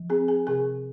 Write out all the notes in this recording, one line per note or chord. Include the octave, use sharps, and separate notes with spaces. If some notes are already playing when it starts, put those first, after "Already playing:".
Already playing: F3
C4 G#4 G#5
G#4 G#5
C3 G#4 G#5